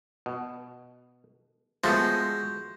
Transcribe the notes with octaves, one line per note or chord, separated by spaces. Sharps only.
B2
F3 G#3 A3 B3 F#4 C6 G6